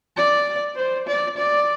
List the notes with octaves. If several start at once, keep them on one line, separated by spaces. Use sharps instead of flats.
D5
C5
D5
D5